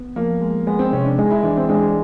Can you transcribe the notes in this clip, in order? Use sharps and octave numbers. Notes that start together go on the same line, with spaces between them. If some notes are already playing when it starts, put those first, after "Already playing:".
Already playing: B3
F3 A#3
G#3
G#3 B3
C4
C3 C#4
D4
G#3 D#4
E4
E3 D4
C4
G#3 D4